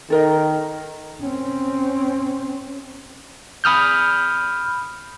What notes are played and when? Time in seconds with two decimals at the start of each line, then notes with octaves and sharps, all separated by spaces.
0.10 D#3 A4 A#4 D#5
1.22 C4 C#4
3.64 B5 D#6 F6 G6